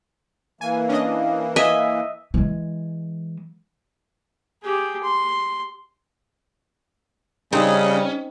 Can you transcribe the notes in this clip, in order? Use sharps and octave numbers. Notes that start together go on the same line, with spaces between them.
E3 A#3 G#5
C#4 D4 D#5
D#5 E5 G#5
E3 G#3
G4 G#4
C6
C#3 G3 C4 C#4 D#4